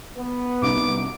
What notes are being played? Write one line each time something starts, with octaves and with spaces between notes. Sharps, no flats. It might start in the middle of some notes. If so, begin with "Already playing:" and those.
B3
C2 F#2 D#4 D6